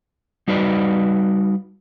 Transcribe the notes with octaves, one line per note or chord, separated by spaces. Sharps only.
G3 D#4 F#4 B4 D5